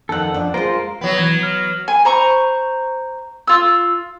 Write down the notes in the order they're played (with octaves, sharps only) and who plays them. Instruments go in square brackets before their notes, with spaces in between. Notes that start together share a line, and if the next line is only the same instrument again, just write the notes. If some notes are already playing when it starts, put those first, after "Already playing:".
[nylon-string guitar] F2 D#3 [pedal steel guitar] A4 F#5
[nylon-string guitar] F2 D4
[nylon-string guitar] G#3 C5 [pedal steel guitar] F4 A#4
[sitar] F#3 B3
[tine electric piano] E3 G#6
F6
[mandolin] G#5
C5 A#5 C#6
F4 E6